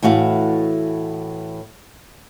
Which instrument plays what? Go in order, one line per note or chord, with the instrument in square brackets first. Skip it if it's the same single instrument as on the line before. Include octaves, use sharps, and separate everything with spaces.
[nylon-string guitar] A2 E3 A3 F#4 F5